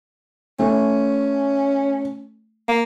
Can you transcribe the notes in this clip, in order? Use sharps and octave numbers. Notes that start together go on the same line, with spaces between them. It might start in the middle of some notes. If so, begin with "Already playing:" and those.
A3 C#4
A#3